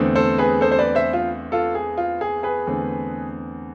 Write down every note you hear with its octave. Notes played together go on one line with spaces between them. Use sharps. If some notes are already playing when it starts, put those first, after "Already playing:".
Already playing: E2 D3 A3 C4
A4 C5
G#4 B4
A4 C5
C5
B4 D5
C5 E5
F4
F4 A4
G#4
F4
G#4
G#4 B4
E2 D3 A3 C4